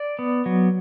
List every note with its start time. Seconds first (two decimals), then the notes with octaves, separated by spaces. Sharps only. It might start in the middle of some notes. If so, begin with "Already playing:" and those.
Already playing: D5
0.19 B3
0.46 F#3